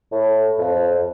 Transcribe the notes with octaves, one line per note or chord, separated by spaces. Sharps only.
A2
F2